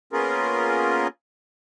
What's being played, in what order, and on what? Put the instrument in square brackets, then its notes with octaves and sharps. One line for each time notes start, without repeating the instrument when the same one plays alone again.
[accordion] A#3 B3 C#4 F4 G#4 A#4